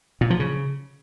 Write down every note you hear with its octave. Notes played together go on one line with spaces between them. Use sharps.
A#2
F3
C#3